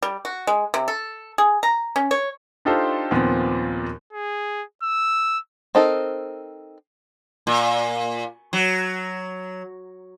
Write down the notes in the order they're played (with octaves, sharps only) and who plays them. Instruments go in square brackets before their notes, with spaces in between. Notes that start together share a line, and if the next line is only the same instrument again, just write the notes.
[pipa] G3
F#4
G#3
C3
A4
G#4
A#5
C#4
C#5
[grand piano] D4 D#4 F4 G4 A4 C5
D#2 A#2 F3 B3 C4
[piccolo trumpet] G#4
E6
[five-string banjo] C4 D#4 A4 A#4
[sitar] A#2
F#3